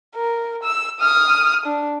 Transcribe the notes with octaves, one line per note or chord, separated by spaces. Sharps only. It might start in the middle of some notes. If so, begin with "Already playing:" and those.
A#4
E6
D#6 F6
D4